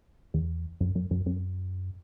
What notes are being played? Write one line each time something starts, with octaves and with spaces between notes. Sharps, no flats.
E2
F#2
F#2
F#2
F#2